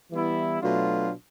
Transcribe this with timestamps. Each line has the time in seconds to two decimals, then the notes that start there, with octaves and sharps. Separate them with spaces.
0.11 E3 G3 B3 E4
0.61 B2 F#3 A3 D4 F4